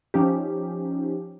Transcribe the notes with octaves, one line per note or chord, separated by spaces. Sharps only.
F3 C#4 D#4 G4